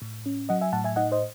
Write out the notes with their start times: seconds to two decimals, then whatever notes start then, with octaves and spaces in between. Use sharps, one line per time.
0.02 A2
0.26 C#4
0.49 F#3 D#5 F#5
0.61 E5 G#5
0.73 A2 F#5 A5
0.84 E5 G#5
0.96 D#4 D#5 F#5
1.12 C5 D#5